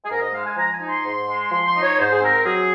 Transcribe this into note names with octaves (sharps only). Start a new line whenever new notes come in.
G#4
G#2 A#4
D#5
G#3 F5
G#5
F3 A#5
G#5
D#4
C6
G#2
G#3
F3 C6
C6
D#4
C#5
G#2 C5
G#4
C4 A#4
F#3 G#4